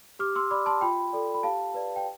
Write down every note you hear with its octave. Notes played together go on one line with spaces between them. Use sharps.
G4 D6 F6
C6 E6
D5 B5 D6
A5 C6
F4 G5 B5
A4 D5
B5
G4 F5 A5
B4 D5
G5